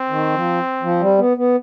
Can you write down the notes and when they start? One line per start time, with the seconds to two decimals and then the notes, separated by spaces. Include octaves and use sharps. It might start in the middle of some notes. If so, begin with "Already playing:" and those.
Already playing: C4
0.09 D#3
0.34 F3
0.82 F3
1.01 G3
1.19 B3
1.37 B3